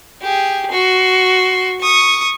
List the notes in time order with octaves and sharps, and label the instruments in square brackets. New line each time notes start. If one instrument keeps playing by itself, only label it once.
[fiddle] G4 G#4
F#4 C6
C#6 D#6